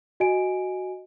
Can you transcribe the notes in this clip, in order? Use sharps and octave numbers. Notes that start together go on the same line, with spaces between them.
F#4 D#5 G#5 D7